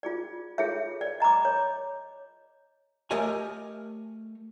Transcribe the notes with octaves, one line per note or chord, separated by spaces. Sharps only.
F4 G#4 D5
F4 G#4 A4 C#5 E5
D5
D#5 A#5 B5 D6
C#5
A3 G4 A#4 C#5 D#5 G#5